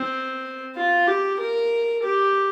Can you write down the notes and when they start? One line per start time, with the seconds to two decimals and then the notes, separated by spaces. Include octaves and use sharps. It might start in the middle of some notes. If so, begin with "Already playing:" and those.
Already playing: C4
0.76 F4
1.07 G4
1.40 A#4
2.03 G4